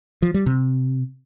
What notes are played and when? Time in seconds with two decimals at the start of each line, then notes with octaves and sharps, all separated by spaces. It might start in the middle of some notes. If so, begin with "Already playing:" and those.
0.22 F3
0.34 G3
0.46 C3